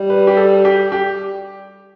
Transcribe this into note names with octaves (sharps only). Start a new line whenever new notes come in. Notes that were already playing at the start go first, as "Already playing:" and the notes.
Already playing: G3
B4
G4
A4
G4
G4